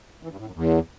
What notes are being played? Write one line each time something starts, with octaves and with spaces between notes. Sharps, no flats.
E3
G2
A2
F#2
E2